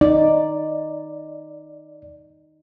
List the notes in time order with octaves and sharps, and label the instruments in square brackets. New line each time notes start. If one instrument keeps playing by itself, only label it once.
[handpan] D#4 [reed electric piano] D5